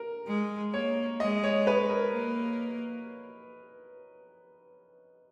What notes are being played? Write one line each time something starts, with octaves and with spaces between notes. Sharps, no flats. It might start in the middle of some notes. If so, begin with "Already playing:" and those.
Already playing: A#4
G#3
A#3 C#5
G#3 D#5
C#5
B4
A#4
A#3